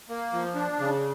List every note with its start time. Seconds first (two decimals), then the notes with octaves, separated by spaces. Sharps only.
0.09 A#3
0.32 F3
0.55 D4
0.79 C#3